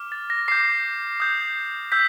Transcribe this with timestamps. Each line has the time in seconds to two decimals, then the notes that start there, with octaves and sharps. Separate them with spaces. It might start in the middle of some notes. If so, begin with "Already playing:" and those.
Already playing: D6 F6
0.12 A6
0.30 A#6
0.48 D6 G6 C7
1.20 D#6 G6
1.92 E6 G6 B6